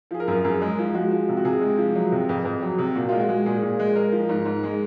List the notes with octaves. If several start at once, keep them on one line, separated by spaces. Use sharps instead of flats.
F3 G#4
A#4
F#2
F#2 G#4
G#3
F3
G#3 F#4
F3
C3
F#4
C3 G#4
G#3
F3
F#3
C3
F2
F2
F#3
C3
A#2 F#4
G#3 F4
F#4
G#3
A#2 G#4
A#2
G#3
G#3 A#4
F3
G#2
G#2
G#3